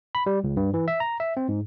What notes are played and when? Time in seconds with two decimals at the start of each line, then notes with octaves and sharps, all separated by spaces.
0.15 B5
0.26 G3
0.44 C#2
0.57 G2
0.74 E3
0.88 E5
1.00 A#5
1.20 E5
1.37 C4
1.49 G#2